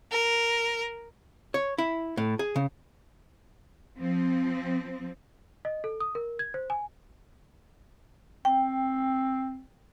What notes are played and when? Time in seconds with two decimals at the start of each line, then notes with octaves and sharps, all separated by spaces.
0.11 A#4
1.54 C#5
1.78 E4
2.17 A2
2.39 G#4
2.56 C#3
3.98 F3 C4
5.65 D#5
5.84 A4
6.00 D#6
6.15 A#4
6.39 G#6
6.54 C5
6.70 G#5
8.45 C4 G5